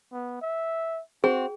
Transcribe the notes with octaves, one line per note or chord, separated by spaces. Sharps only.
B3
E5
C4 F#4 G#4